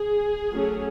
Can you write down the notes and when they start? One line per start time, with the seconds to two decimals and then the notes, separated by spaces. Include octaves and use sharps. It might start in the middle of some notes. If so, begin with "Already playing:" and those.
Already playing: G#4
0.51 F#3 A3 C#4